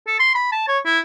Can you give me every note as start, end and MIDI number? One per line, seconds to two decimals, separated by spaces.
0.07 0.15 69
0.19 0.31 84
0.35 0.50 83
0.52 0.67 81
0.68 0.78 73
0.85 1.00 64